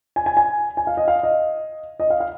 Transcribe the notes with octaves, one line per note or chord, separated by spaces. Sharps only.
G#5
G#5
G#5
G#5
F5
D#5
F5
D#5
D#5
F5
F5